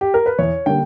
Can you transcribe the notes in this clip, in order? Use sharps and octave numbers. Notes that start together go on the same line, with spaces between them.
G4
A#4
B4
E2 C#5
D3 G3 A#3 G5